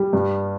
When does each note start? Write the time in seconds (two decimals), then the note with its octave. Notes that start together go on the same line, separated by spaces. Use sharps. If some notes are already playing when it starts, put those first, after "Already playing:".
Already playing: G3
0.13 G2